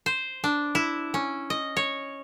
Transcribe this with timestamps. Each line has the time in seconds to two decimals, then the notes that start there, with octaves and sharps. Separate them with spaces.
0.06 C5
0.44 D4
0.75 E4
1.14 C#4
1.50 D#5
1.77 C#5